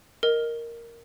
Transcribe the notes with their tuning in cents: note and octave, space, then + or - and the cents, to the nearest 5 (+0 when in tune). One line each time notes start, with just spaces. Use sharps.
A#4 +0 D#5 +0